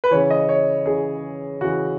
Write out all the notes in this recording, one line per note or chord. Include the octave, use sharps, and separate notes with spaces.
B4
C#3 E3 C#5
D#5
C#5
C#3 E3 G#4
C#3 E3 F#4